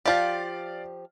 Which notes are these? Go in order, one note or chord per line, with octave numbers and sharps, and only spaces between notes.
F3 G4 D5 F5